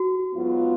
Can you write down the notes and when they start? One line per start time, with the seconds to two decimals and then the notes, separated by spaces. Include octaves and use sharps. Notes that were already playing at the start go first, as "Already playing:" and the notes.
Already playing: F#4
0.35 G#2 F#3 B3 F4